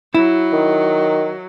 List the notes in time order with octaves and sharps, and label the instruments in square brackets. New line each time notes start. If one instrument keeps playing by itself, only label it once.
[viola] F#3 [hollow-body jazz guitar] E4
[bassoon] D#3